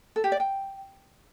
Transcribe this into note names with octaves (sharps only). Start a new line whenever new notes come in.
A4
G4
D5
G5